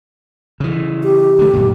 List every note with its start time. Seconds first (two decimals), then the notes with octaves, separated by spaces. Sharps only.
0.60 C#3 E3
1.03 G4
1.39 D3 A3
1.53 F#2 A#2